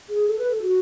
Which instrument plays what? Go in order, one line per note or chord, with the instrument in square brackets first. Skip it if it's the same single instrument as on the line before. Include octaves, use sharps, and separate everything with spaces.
[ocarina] G#4
A4
B4
A4
F#4